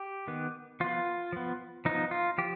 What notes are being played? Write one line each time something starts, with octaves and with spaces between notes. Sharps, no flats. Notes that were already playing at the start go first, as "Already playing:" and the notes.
Already playing: G4
D#3 B3
F3 B3 F4
F3 B3
F3 B3 D#4
F4
F3 G4